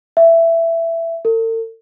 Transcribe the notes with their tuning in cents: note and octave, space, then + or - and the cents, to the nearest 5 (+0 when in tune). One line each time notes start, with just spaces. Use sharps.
E5 +15
A4 +45